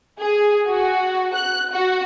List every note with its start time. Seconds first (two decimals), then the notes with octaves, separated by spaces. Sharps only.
0.20 G#4
0.66 F#4
1.35 F#6
1.72 F#4